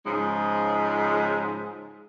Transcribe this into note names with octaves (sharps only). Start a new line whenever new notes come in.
G#2 C#3 F3 G#3